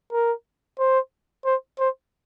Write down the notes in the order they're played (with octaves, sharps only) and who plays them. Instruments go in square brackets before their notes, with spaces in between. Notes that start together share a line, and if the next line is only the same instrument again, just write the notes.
[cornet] A#4
C5
C5
C5